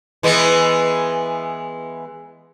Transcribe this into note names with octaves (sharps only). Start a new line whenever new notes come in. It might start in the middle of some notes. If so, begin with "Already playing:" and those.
E3 G#3 B3